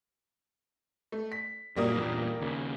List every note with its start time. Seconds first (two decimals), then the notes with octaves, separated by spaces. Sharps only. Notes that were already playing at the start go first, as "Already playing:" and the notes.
1.12 A3
1.32 B6
1.76 F#2 A#2 F#3 G3 A#3 D#6
1.96 E2 G2 A#2
2.41 D#2 C#3